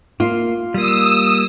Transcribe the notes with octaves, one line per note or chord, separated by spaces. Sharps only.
A#3 F4
G3 A#3 D#6 E6